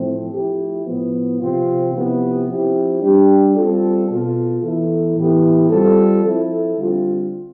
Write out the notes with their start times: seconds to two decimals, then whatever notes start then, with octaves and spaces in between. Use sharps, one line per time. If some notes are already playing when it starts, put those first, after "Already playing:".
Already playing: A2 F3 A3 C4
0.32 F3 A3 E4 G4
0.85 A2 F3 B3
1.40 C3 F3 C4 F4
1.93 C3 F3 B3 E4 G4
2.47 F3 C4 E4 G4
3.01 G3 D4 G4
3.55 G3 C4 F4 A4
4.08 B2 B3 F4 A4
4.62 E3 B3 E4 A4
5.16 A2 E3 B3 E4 G4
5.70 G3 C4 F4 A4
6.24 F3 C4 E4 A4
6.77 D3 G3 C4 F4